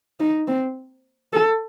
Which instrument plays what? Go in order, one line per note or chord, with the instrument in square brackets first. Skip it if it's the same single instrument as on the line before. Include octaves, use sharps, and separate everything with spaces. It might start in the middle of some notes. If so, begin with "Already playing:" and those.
[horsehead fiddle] D#4
C4
A4